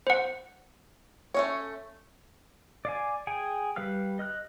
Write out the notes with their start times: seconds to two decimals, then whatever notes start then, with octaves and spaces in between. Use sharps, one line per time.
0.07 C5 F#5
1.34 A3 C#4 C#5
2.85 D5 F5 G#5
3.27 G#4 G5 G#5
3.76 G3 B4 F5 F6
4.19 D#5 F6 F#6